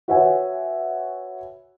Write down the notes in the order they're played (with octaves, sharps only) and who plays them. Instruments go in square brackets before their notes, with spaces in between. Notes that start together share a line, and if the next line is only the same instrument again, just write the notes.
[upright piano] F#4 B4 C#5 E5 F#5 G#5